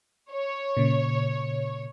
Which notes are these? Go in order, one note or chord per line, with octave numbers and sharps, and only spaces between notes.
C#5
A#2 C#3